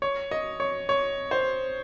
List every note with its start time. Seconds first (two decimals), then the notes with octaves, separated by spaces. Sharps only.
0.02 C#5
0.31 D#5
0.60 C#5
0.89 C#5
1.31 C5